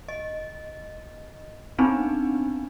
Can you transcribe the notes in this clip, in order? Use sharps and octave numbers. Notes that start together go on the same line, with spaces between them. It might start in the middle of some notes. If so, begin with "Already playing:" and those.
D#5
B3 C4 D4 D#4